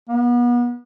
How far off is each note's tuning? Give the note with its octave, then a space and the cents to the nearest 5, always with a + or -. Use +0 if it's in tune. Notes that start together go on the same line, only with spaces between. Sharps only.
B3 -35